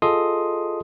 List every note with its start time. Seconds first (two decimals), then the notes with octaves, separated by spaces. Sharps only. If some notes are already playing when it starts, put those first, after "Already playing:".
0.02 F4 G#4 A4 D#5 C6 D#6